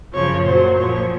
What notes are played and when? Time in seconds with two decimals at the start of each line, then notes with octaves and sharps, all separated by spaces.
0.14 F#2 C#3 F3 C#5
0.45 A#2 F#3 C5
0.76 A#2 F3 C#5